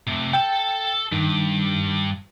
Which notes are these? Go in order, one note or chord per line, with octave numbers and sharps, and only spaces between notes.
C3 A3
A4 G5 A5
G2 D#3